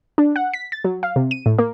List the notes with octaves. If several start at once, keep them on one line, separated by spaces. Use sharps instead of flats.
D4
F#5
B6
A6
F#3
F5
C3
D#7
A2
A#3